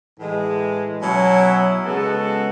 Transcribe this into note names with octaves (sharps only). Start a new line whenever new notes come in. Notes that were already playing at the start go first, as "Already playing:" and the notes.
A2 E3 G#3
B2 F#3 C#4 E4
C#3 G#3 B3 F#4 A4